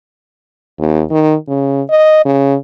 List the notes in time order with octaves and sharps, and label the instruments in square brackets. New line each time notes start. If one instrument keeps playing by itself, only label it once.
[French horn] D#2
D#3
C#3
D#5
C#3